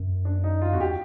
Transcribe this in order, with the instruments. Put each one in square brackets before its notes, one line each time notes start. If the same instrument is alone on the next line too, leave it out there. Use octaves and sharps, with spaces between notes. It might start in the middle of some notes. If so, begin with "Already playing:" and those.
Already playing: [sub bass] F#2
[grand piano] D4
D#4
F4
[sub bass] E2 [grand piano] F#4
[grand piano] G4